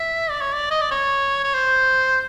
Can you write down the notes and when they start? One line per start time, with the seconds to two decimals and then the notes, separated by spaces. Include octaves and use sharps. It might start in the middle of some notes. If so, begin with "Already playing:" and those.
Already playing: E5
0.30 D5
0.41 C#5
0.53 D5
0.70 D#5
0.81 D5
0.91 C#5
1.44 C#5
1.54 C5